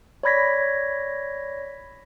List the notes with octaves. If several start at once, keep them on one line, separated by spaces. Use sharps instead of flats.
C#5 D5 B5 G#6 A#6 B6